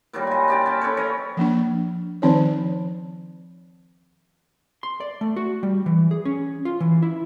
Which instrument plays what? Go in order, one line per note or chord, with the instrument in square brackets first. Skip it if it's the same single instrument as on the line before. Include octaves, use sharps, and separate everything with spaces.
[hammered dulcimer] A#2 D#3 F#3 G3
D#5 G#5
D4 G4 D5
C#4 G5 A5
C#4 A4 B4 C#5
F3 C#5 D#5
[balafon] F3 A#3 D4
D#3 F3 C4 D#4 C#5
[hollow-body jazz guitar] C6
D5
A3
F#4
G3
E3
G#4
C#4
F4
E3
E4